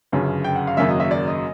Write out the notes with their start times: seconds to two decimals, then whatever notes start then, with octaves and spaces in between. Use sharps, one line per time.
0.12 G1 F#2 C#3
0.44 G5
0.56 F#5
0.67 F5
0.77 G#1 F#2 C#3 F#3 A#3 E5
0.89 D#5
1.00 E5
1.11 D5
1.28 D#5